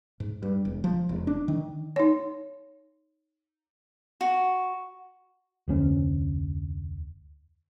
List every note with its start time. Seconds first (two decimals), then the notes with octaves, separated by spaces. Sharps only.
0.20 G#2
0.43 G2
0.65 E1
0.84 F3
1.09 E1
1.27 D4
1.48 D#3
1.96 D#4 C#5
4.21 F#4
5.68 F1 D2 C#4